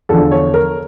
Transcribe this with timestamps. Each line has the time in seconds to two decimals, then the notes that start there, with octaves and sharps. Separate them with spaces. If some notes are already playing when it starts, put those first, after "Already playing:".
0.09 E2 D3 F3 A4
0.31 C#5
0.54 A#4